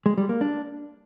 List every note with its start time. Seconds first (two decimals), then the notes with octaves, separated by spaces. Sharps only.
0.06 G#3
0.18 G3
0.29 A#3
0.41 D4